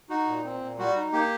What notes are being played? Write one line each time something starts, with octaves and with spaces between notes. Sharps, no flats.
D#4 F#4
A#2
C4
A#2
G3 F#4
D#4
A#3 G4